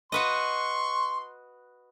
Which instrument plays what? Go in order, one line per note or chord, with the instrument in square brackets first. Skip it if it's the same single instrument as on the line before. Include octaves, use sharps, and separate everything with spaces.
[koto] F#4 B4 D#5 [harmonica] C6 C#6